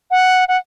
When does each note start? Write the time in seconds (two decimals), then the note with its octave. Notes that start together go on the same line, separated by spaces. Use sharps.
0.11 F#5
0.48 F#5